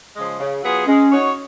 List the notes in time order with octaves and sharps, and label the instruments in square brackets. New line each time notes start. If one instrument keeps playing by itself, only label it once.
[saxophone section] C#3 F3 G#3
C#3
F#3 B3 F4 G#4
[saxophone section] G#3 [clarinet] C#4
[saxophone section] D#4 F#4 C#5